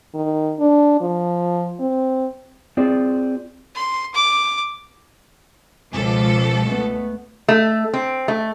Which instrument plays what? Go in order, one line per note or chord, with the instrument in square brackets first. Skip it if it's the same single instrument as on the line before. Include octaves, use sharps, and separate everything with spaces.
[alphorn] D#3
D4
F3
C4
[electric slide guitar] C4 F4 G#4 D5
[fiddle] C6
D6
[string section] C#2 A4 [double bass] B2 F3
[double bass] A3 B3
[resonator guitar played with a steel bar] A3
C4
A3